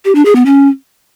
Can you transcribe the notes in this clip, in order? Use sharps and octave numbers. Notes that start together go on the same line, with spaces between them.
G4
D4
G#4
B3
C#4